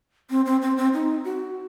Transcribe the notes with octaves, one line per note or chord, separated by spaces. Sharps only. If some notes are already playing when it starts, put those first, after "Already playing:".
C4
C4
C4
C4
D#4
F#4